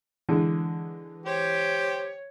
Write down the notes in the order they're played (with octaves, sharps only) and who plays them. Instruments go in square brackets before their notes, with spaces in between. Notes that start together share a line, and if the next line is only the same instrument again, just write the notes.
[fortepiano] D3 G#3 [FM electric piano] E3
[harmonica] G4 C5 [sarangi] C#5